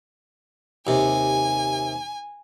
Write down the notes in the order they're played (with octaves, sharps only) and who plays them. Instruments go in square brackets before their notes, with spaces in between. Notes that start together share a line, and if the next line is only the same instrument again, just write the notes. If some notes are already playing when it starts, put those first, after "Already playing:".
[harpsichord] D#2 C3 [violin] G#5